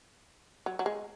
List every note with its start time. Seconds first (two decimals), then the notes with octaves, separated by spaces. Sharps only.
0.66 F#3
0.79 F#3
0.86 G#3